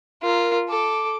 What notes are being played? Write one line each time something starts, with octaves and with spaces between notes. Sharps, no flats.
F4 A#4
A4 D6